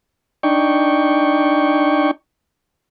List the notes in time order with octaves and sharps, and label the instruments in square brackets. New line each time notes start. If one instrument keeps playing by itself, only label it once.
[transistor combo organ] D4 D#4 G5 C#6